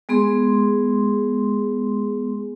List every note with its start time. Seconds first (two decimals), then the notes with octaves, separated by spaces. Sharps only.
0.09 G#3 B3 G#4 C6